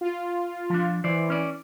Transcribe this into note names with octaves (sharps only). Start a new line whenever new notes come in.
F4
F3 D4
E3 C5 D5
C#4 D5